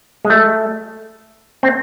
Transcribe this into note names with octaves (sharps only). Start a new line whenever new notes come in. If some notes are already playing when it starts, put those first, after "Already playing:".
G#3
A3
C4